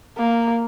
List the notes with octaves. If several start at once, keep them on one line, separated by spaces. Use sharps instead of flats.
A#3